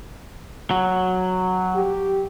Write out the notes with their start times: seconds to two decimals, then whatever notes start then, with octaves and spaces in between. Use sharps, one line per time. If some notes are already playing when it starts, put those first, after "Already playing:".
0.71 F#3
1.76 G4